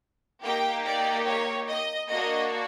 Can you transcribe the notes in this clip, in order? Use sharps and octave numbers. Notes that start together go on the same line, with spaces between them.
A#3 D#4 G4 G5
D5
C#5
D#5
A#3 D4 F#4 D#5